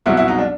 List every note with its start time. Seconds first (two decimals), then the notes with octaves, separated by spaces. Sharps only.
0.06 C2 B2 F#3 E4
0.17 E4
0.28 D#4
0.39 D4